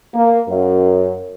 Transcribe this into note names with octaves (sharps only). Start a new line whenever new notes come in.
A#3
F#2